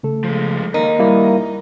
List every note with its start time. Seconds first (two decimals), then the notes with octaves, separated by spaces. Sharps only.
0.03 C#3 A3 A4
0.24 F3 G#3
0.74 D#2 D#4 A#4
0.99 G3 A#3 E4